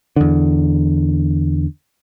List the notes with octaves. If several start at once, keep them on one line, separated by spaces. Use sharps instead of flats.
E2 D3